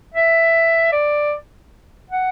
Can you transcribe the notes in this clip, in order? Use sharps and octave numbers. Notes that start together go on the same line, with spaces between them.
E5
D5
F#5